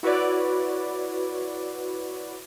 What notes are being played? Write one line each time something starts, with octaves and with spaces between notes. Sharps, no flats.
E4 F#4 B4 C#5 D5